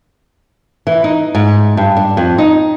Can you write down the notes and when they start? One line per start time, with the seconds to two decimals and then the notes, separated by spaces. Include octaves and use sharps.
0.87 E3
1.04 D#4
1.35 G#2
1.77 G2
1.96 D4
2.17 F2
2.38 D#4